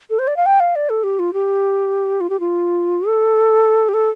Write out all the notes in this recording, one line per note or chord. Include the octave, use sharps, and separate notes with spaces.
A4
C5
D5
F5
G5
F5
D5
A4
G4
F4
G4
F4
G4
F4
A4
G4
A4